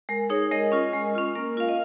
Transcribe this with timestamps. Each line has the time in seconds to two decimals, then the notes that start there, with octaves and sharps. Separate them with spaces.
0.09 G#3 A#4
0.30 D#4 G#4 C#5
0.51 G#3 A#4 D#5
0.72 C#4 F4
0.93 G#3
1.15 C#4 F4
1.35 A#3 A#4
1.57 F4 F5
1.69 D#5